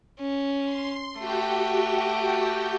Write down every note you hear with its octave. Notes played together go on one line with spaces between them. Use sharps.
C#4
C6
A3 F#4 G4 G5